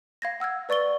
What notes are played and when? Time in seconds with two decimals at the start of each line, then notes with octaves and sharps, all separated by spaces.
0.22 F5 G#6 A#6
0.40 F#5 E6 F6 G#6
0.69 B4 D5 C#6 A6 G7